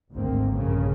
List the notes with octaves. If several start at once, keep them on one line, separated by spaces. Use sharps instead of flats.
G#1 D2 A#3 C4
A#1 G2 C#3 A#3